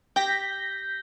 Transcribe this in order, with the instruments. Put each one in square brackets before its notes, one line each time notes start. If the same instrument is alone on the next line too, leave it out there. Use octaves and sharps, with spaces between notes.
[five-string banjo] G4 [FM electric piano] G6 A#6 B6